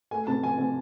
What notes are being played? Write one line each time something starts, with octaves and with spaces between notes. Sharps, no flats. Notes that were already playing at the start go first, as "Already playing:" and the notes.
A3 G#5
C3 A5
F3 G#5
C3 G#5